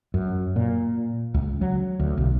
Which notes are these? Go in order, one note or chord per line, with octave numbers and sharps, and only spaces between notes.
F#2
A#2
C#2
F#3
D2
B1